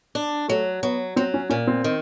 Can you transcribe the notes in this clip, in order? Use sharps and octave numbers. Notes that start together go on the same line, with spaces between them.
D4
F#3 A3
F#3 B3
F#3 C4
C#4
A#2 C#4
C4
D#3